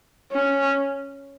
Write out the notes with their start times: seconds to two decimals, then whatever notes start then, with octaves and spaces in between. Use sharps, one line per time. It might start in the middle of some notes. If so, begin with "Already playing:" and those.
0.32 C#4